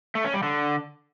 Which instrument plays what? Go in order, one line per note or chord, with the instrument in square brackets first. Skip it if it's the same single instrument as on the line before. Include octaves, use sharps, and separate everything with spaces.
[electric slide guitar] A3
C#4
G3
D3